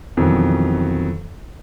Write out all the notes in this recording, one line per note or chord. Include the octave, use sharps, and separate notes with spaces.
F2 B2 D#3 E3 F#3